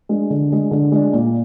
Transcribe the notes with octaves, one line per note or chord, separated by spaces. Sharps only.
G#3 D4
D3
G#3 D4
D3
G#3 D4
A#2